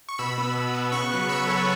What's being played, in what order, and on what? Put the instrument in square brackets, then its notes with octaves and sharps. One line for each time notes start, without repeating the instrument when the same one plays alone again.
[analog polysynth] C#6
B2 B5 E6
B3
B2
B3
C#3 C#6 F#6
F#3 B3
C#3 B5 E6
F#3 B3 A4 C#5